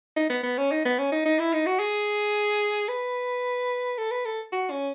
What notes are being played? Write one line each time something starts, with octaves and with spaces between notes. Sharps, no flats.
D#4
B3
B3
C#4
D#4
B3
C#4
D#4
D#4
E4
D#4
F#4
G#4
B4
A4
B4
A4
F#4
C#4